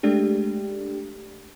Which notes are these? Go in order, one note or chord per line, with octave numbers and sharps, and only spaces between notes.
G#3 A3 D4 G4